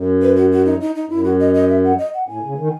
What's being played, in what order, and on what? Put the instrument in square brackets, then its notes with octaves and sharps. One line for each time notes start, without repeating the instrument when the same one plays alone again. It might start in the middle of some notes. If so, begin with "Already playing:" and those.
Already playing: [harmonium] F#2
[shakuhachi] B4
F#4
F#4
D#4
D#4
D#4
[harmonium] F#2 [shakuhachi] E4
[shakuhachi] F#4
D#5
D#5
E5
F#5
D#5
F#5
[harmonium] A2 [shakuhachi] G#5
[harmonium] C#3
D#3